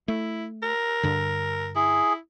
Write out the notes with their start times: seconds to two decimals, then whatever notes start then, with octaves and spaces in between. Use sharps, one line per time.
0.08 A3 E4
0.63 A#4
1.03 G2 D3
1.76 E4 G#4